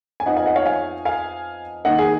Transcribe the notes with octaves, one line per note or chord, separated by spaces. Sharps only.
G#5
F2 F3 B3 D#4 D#5 F#5
F5 G#5
D#5 F#5
C#5 F5
F5 G#5
F5 G#5
D#3 A#3 D#4 D#5 F#5
G#4